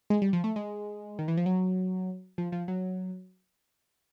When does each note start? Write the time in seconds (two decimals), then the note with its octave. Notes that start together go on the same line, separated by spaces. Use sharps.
0.10 G#3
0.22 G3
0.33 F3
0.44 A3
0.56 G#3
1.19 D#3
1.28 E3
1.37 F3
1.46 F#3
2.38 F3
2.52 F3
2.68 F#3